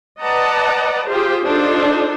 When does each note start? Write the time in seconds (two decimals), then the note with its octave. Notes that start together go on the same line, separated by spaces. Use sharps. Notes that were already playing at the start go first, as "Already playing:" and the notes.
0.21 B4 D5 D#5 F#5 A5 A#5
1.08 F4 G4 G#4 C5
1.44 D4 D#4 F4 A4 C5